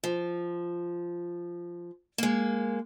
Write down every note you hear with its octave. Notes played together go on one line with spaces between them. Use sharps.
F3
G#3 A#3